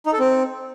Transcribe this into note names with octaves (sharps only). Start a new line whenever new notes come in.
D#4
A4
C4